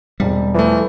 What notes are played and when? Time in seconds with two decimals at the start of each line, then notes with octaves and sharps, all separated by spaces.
0.20 E1 G3 C4 D5
0.54 E3 F3 A3